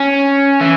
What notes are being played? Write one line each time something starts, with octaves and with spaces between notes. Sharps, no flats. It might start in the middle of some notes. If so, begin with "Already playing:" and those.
Already playing: C#4
E3